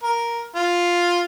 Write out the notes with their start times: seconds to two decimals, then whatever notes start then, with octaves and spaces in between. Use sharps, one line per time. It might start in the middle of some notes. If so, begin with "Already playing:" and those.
0.03 A#4
0.55 F4